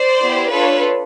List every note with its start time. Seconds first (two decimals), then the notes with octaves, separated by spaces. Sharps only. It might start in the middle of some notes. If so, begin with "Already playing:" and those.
Already playing: C5 D5
0.20 B3 E4 G4
0.51 D4 F4 A4 B4 C#5